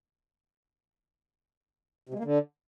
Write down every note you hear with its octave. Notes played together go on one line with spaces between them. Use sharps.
C3
G#3
A#3
D3